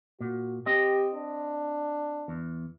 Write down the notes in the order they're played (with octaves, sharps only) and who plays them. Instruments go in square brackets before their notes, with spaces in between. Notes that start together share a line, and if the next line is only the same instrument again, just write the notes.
[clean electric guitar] A#2 [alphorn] F#4
[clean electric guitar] C4 D#5 [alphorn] G4
[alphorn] D4
[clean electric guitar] E2